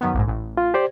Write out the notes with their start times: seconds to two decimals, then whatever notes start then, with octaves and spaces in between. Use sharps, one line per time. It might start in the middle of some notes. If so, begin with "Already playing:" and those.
0.01 F#2 D#3 B3
0.14 A#1 G#2
0.28 A1
0.57 F4
0.74 G4 C5 D5